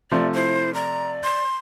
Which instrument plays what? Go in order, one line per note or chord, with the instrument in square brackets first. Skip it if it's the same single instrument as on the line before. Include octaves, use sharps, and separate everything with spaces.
[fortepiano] C3 F3 A3 [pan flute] D5
[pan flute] E4 [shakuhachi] C5
[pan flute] D5 [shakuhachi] A#5
[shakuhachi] C6